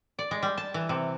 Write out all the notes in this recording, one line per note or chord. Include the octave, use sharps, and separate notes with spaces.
D5
G#3
G3
A5
E3
C3